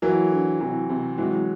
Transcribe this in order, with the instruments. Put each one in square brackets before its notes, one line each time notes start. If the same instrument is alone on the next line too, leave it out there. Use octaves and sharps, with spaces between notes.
[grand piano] E3 F#3 [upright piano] A#3
[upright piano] D3
[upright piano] C3 [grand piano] E3 F#3
[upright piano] C3
[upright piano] E3 [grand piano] F#3 G#3